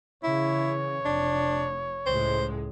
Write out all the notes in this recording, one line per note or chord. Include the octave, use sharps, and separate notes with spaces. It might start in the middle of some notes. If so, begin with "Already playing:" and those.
C#3 E3 E4 C#5
F1 D4
C#2 A2 G#3 C5